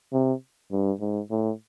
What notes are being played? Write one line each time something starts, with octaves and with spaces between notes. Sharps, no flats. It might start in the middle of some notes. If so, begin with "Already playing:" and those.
C3
G2
G#2
A2